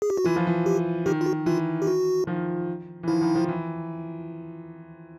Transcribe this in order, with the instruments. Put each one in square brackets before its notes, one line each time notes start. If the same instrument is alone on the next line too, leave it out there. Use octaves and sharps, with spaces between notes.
[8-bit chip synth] G#4
G4
F#4
[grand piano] E3 [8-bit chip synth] F4
[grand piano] F3
E3
[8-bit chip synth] G4
[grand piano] D#3 [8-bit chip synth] G4
[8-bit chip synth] F4
F#4
[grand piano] E3 [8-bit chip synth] F4
[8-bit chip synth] G4
F#4
[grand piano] D#3 F3
E3
[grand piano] D#3 F3 [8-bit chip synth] E4
[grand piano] D#3 F3
D#3 F3
E3